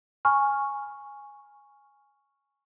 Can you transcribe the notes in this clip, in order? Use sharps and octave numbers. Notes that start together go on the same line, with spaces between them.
G#5 B5 C#6 F6